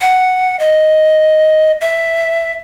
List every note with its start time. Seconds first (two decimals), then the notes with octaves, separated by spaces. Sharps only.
0.01 F#5
0.59 D#5
1.81 E5